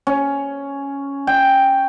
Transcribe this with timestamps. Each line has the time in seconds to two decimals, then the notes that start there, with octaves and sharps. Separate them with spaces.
0.07 C#4
1.27 G5